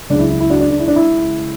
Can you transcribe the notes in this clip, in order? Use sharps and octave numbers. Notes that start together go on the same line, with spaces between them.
C#2 C#3 F#3 D4
E4
E4
E4
D4 F#4
D4
D4
E4
D4
E4